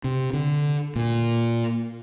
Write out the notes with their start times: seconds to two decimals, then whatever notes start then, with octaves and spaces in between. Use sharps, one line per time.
0.04 C3
0.33 D3
0.96 A#2